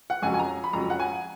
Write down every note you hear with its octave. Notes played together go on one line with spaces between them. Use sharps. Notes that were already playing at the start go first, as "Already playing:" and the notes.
F#5
F2 C#3 F#3 G#5
G#5
A#5
B5
F2 C#3 F#3 A#5
F#5
G#5